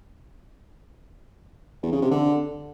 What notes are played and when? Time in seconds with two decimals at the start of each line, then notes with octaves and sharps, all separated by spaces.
1.83 E2
1.92 C#3
2.02 C3
2.11 D3